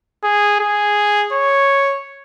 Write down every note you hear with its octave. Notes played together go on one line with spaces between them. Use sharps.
G#4
G#4
C#5